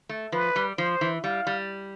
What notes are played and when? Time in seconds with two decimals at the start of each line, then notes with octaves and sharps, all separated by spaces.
0.09 A3
0.32 F3 B4
0.56 G3
0.78 F3 C5
1.01 E3
1.24 G3 F5
1.47 G3